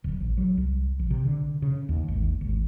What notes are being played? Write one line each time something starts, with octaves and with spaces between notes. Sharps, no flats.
D1
A1
F#3
C2
A#1
C3
D3
C#3
D#2
G#1
D#2
G#1